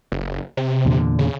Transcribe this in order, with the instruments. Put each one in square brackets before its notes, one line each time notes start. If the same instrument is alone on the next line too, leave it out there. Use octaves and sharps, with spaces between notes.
[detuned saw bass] F#1
C3
[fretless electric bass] E2 A#2 D3
[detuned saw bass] C#3